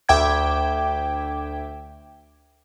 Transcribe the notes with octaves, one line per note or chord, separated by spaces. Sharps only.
D2 E5 G5 D6 G#6